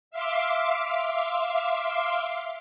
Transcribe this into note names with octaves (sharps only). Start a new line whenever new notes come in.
E5 F5 C6 D6